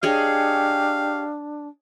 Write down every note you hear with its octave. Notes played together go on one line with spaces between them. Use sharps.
D4 G4 G#4 C#5 D#5 F5